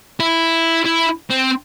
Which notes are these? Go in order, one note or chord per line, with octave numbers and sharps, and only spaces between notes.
E4
E4
C4